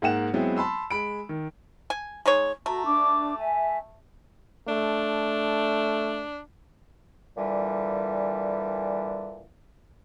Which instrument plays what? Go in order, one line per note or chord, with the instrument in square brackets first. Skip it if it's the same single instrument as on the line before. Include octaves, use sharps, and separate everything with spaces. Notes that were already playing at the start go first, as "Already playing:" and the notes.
[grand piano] G#2 A#3 F#5 E7
F#3 G#3 B3 C4 E4
A5 B5 C6 E6
G#3 B5 D7
D#3
[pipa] G#5
G#3 D#4 C#5
[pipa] A3 [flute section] F#4 A#5
[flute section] D4 D6
E5 G#5
[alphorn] A3 [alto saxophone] D4
[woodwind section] A#2 D3 E3 G3